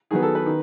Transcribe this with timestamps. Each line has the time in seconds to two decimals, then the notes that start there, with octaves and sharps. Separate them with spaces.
0.11 D#3 F#3 B3 G#4
0.23 A4
0.35 B4
0.46 D#3